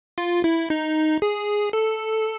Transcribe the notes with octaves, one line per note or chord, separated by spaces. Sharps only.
F4
E4
D#4
G#4
A4